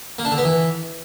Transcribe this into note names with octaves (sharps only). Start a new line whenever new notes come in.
A#3
D4
D3
B3
E3